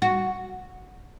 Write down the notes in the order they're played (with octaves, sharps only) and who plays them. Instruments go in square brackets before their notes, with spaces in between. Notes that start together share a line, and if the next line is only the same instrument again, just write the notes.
[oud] F#4